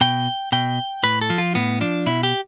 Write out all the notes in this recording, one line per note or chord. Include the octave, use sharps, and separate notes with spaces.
B2 G5
B2 G5
A2 B4
A4
F3
F4
A2 B3
F3 D4
B2 E4
G4